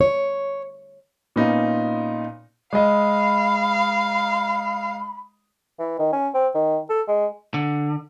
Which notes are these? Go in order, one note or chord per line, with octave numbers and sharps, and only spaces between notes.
C#5
A#2 B3 C#4 D#4 F4
G#3 D#5 F5 B5
E3
D#3
C#4
C4
D#3
A4
G#3
D3